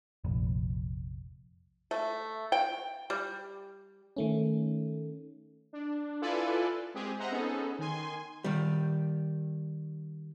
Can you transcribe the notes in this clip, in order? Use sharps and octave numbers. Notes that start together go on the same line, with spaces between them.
F1 A#1
A3
G5
G3
D#3 A3 C#4
D4
E4 F4 A4 B4 D5 G#5
G#3 C4 G4 G#4
C5 D#5 E5 F#5 A#5
B3 C#4 D#4 G#4 A4
D#3 G#5 C6
D#3 G3